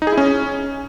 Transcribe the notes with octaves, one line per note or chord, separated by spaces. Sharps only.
D#4
G#4
E4
C#4